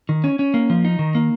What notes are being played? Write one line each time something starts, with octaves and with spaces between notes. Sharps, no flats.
D#3
C#4
C#4
A#3
F3
D#4
D#3
A#3